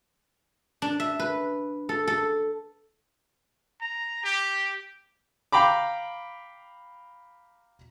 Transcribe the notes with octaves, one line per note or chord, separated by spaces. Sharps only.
D4
E5
B4
A4
A4
A#5
G4
F5 G5 A#5 B5 D6